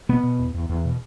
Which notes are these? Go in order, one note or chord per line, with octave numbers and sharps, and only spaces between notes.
B2 B3
B2
E2
E2
E2
B2